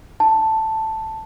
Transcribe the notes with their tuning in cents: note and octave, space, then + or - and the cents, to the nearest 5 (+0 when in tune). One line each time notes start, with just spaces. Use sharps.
A5 +5